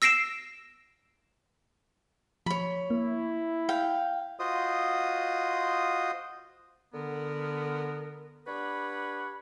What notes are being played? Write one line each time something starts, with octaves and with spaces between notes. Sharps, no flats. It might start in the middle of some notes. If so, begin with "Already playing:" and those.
E6 A#6 C7 D7 E7
F3 C#5 B5
A#3 E4
F5 G5
F4 F#4 C5 D#5 D#6
D3 B3 A#4
D4 G4 B4 C#5 F#5 B5